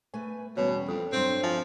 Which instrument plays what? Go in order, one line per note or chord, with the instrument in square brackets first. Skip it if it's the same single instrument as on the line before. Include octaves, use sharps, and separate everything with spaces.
[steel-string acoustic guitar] A3 B4 G#5
[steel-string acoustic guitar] E2 G3 C#4 [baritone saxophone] B2 [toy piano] C#5
[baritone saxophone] F2 [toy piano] A4
[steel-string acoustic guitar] G2 F#3 C5 [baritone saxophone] C4
[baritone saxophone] F3 [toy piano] E5 G#5